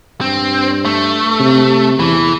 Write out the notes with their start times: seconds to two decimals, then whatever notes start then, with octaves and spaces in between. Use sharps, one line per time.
0.21 G2 C4
0.85 A3
1.40 C3
1.99 E2 E3